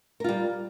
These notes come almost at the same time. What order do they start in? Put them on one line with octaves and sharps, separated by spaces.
A#4 F4 G3